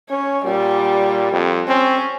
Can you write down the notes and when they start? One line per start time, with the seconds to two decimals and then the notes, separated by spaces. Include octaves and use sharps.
0.10 C#4 C#5
0.45 A#2 G3
1.32 F2
1.68 C4 C#4